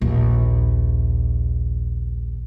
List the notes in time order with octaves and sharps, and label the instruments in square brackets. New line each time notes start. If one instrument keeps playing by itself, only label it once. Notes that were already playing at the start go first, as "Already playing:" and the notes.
[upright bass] A#1 D#2